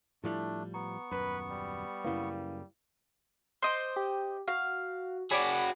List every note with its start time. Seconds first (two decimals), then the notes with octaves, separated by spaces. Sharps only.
0.24 A2 F3 G3 A3 D4 E4
0.74 B3 A#5 C#6
1.11 D#1 G#1 F#2 B4
1.51 G3
2.04 F#2 C#3 A#3 E4 B4 F5
3.62 C5 D#5 C6 D6
3.96 G4
4.48 F#4 F5
5.31 F#4 G#4 C#5 D5 B5